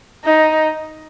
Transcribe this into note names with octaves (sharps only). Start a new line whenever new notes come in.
D#4